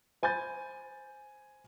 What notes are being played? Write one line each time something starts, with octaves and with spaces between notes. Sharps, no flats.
C5 G#5 B5 G6 A6